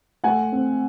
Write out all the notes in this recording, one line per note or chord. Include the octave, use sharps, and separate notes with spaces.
A3 F#5 G#5
C4